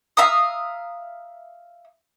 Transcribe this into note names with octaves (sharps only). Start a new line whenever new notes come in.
E5 F5 A#5 D#6